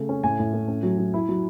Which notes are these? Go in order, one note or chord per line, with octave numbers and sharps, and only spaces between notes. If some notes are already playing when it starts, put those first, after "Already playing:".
Already playing: C#3 A3
C#4
A2 G#5
A2
A2
C#4
F#3
F#3
E4
F#3